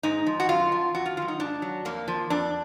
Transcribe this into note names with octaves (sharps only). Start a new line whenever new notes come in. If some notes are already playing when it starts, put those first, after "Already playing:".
G#2 D#4
F3
F#4
F#2 F4
F3
F2 F#4
F4
D#3 F#3 F4
D#4
G#2 D4
F#3
F2 A#3
F3
F2 D4